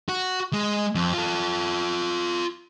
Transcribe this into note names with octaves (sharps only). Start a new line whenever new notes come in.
F#4
G#3
F2
F4 A4